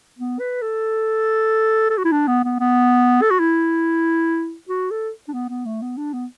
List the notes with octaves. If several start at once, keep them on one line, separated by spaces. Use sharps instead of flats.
B3
B4
A4
A4
F#4
E4
D4
B3
B3
B3
A4
F#4
E4
F#4
A4
D4
B3
B3
A3
B3
D4
B3